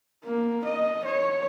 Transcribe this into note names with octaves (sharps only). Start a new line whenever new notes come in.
A#3
D#5
C#5